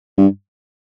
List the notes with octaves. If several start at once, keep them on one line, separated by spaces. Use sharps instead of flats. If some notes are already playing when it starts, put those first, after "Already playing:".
G2